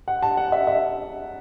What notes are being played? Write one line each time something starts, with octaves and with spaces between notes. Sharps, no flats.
F#5
A5
F#5
E5
E5